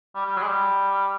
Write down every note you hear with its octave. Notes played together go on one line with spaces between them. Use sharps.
G3
G3
F#3
G#3
G3